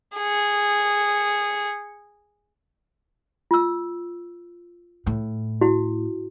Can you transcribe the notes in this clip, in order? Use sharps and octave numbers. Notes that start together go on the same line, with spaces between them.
G#4 C#7
F4 E6
A2
E4 F#4